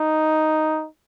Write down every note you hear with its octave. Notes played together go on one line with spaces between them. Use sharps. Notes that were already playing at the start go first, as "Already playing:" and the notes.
Already playing: D#4